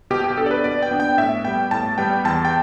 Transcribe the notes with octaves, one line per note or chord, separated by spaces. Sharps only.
B2 G4
G4
B3 D4 A4
D5
B4
B2 D5
G5
B3 D4
G5
A2 E5
G3 B3 G5
A2 A5
G3 B3 G5
E2 A5
G5